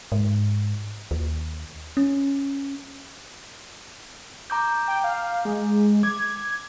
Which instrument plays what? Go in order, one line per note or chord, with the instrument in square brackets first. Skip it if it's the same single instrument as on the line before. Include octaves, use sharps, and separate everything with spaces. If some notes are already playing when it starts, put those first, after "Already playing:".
[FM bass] G#2
D#2
C#4
[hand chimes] A#5 D6 G6
[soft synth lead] G5
F5
G#3
[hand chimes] D6 [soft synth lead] G#6